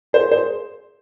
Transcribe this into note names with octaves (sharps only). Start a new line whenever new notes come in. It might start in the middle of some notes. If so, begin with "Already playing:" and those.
G#4 C5
G#4 C5